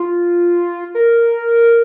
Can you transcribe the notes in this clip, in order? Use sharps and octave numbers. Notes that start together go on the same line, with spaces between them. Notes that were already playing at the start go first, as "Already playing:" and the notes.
Already playing: F4
A#4